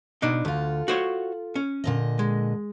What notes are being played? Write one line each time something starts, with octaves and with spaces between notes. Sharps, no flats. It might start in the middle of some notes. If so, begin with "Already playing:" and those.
B2 D4 D#4
D2 F4 A4
F#4 C5 C#5
C#4
A#2 D3 D#5
G#3